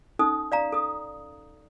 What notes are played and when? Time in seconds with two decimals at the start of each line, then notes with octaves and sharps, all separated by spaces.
0.19 C#4 D#4 A4 D#6
0.52 D5 F5 A#5
0.72 A4 D#6